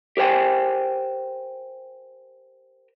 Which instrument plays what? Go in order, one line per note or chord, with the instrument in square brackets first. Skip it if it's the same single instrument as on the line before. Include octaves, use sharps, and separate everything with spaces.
[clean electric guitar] G4 A#4 C5 G5 G#5